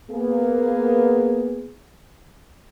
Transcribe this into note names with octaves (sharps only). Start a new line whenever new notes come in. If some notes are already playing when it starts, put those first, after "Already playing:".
A#3 B3 G#4